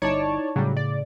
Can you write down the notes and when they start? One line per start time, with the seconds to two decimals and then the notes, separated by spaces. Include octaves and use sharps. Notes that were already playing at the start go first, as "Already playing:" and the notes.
0.02 G1 D#4 E4 C#5 D5 A5
0.56 A2 C#3 F#3 G3
0.77 D5